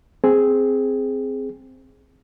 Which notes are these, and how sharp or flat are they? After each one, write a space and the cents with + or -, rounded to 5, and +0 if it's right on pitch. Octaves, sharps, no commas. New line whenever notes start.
C4 +0 G#4 +0